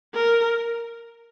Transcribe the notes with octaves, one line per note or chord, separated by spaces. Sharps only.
A#4